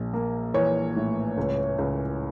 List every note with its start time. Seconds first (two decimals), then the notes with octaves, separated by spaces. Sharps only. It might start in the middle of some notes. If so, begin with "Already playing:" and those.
Already playing: A#1
0.14 A#3
0.54 E3 C#5
0.96 A2
1.37 C#2
1.78 C#2